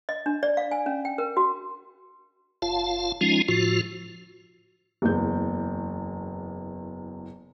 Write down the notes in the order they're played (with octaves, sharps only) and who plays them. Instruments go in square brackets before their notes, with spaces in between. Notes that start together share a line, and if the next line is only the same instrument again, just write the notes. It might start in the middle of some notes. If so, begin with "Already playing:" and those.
[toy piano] D#5
D4
D5
F5
G#5
C#4
G5
A#4
F#4
[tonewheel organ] F#1 F4 F5 A5
F3 G#3 C#4 D#4 F4
A2 F3 F4 F#4
[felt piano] F#1 E2 G6